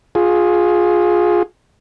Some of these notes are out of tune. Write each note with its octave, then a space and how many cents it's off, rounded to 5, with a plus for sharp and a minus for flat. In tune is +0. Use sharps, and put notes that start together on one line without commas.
F4 +15 G#4 +0